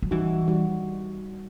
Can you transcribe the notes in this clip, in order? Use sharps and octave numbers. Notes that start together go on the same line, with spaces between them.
F#3
E3 G3 D#4 F#4
G3 D#4 F#4